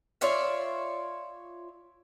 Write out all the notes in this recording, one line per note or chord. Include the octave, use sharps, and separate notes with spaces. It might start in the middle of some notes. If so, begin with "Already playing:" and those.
F4 C#5 D5 E5